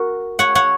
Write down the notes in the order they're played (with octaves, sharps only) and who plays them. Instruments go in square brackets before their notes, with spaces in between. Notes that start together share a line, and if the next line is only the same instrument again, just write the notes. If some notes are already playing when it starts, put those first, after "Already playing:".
Already playing: [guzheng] F#4 A#4
C#5 F#5
C#5 F#5